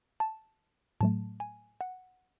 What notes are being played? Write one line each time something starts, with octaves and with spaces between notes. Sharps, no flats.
A5
A2 F#3 A3 A5
G#5
F#5